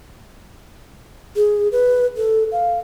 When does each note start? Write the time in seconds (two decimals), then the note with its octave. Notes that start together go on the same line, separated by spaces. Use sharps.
1.36 G#4
1.72 B4
2.17 A4
2.52 F5